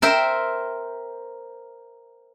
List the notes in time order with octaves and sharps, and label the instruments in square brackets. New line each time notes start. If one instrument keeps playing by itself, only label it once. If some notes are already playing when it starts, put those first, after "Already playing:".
[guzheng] A#4 C5 E5 G5